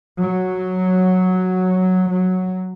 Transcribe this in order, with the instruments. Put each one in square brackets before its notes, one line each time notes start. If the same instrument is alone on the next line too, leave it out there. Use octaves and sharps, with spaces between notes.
[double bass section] F#3
F#3